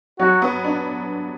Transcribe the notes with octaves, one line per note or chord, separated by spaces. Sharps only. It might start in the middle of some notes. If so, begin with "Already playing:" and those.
F#3 F#4
B3
D4